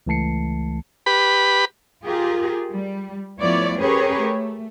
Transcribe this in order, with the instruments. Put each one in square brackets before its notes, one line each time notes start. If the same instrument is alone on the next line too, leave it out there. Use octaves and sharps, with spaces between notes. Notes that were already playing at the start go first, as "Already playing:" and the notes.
[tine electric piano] C#2 E3 A3 A5 C7 C#7
[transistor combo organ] G4 B4 B5
[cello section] F4 G4 G#4 A#4
G3
F3 A3 B3 E4 C#5 D5
C#4 G4 G#4 A#4 B4 C#5
A3